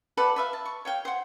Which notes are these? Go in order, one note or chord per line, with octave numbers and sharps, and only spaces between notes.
A4 B4 D5 F#5
B4 E5 F5
A5
C#6
C#5 F5 G5
C5 F#5